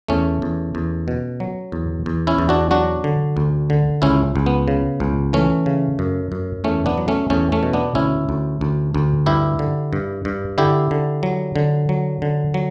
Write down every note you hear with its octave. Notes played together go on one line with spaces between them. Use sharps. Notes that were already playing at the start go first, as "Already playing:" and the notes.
E2 A3 C#4
E2
E2
B2
F#3
E2
E2
C#4 E4
E2
D4 F#4
F#3 D4 F#4
D3
D2
D3
C#2 C#4 E4
C#2
B3
C#3
C#2
E3 A3 C#4
C#3
F#2
F#2
E2 A3 C#4
B3 D4
F#3
A3 C#4
E2 A3 C#4
A3 C#4
B2
B3 D4
D2 C#4 E4
D2
D2
D2
G2 E4 G4
D3
G2
G2
D3 E4 G4
D3
F#3
D3
F#3
D3
F#3